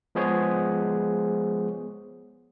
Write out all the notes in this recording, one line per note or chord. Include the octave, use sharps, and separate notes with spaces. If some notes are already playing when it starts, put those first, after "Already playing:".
F3 G#3 B3 G#4 C5 C#5